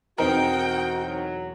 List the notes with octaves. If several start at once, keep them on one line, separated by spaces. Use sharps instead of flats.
E1 E2 C4 D#4 F#4 A#4 G5
F#3